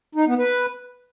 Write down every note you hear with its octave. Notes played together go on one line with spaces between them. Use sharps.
D#4
B3
B4